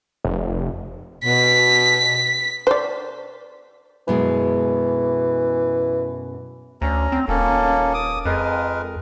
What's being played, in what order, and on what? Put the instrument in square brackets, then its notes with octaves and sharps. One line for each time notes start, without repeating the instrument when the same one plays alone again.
[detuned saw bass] F1
[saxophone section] B2 [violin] B6
[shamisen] C5 D5
[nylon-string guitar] F#2 B2 G#3 [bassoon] E3
[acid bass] D2 [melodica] C#4 A#5
[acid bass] C4
[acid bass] D#1 [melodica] A#3 C#4 A4
[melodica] D6 D#6
[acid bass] F2 [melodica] G#3 A#4 B4